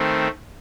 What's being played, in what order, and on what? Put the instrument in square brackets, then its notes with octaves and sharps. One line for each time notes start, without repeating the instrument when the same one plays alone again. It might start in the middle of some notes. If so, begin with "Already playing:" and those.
Already playing: [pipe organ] D#3 A3 C4